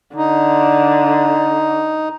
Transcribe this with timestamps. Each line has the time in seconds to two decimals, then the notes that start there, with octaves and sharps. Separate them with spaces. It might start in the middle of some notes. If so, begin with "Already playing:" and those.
0.16 D3 D#4